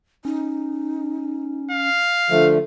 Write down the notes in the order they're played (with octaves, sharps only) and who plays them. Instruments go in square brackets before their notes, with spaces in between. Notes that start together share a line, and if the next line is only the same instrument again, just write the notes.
[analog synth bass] C#4 [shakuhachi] D#4
[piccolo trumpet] F5
[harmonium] D3 F3 A3 [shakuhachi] E5